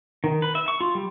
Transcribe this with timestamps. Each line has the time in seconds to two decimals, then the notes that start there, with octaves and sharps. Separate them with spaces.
0.24 D#3
0.42 B4
0.55 E5
0.68 C#6
0.81 F4
0.95 G3